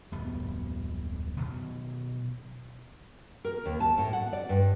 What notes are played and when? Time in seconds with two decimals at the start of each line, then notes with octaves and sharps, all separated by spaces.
0.12 D1 F2 G3 B3
1.37 B2 D#3 F#3
3.45 A#4
3.65 D#2
3.80 A5
3.98 A2
4.13 F#5
4.33 D5
4.49 G2